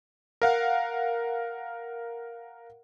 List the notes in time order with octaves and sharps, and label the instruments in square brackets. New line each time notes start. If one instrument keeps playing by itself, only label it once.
[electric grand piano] A#4 F5 F#5